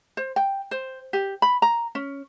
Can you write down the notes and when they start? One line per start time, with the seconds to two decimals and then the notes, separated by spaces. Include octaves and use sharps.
0.17 C5
0.36 G5
0.71 C5
1.13 G4
1.42 B5
1.62 A#5
1.95 C#4